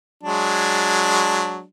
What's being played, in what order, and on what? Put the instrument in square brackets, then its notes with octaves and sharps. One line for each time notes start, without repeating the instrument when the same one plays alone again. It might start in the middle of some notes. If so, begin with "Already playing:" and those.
[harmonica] F#3 G#3 D4